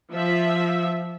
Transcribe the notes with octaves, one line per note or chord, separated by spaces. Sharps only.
F3 E5